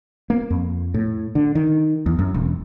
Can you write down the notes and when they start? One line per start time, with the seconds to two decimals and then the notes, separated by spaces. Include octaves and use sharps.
0.30 A#3
0.50 F2
0.94 A2
1.35 D3
1.55 D#3
2.06 E2
2.19 F#2
2.34 E1